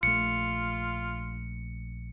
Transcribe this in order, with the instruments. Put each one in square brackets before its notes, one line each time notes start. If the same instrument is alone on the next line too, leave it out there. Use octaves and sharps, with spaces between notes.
[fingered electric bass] A#1 A3 [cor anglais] F4 [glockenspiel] C#7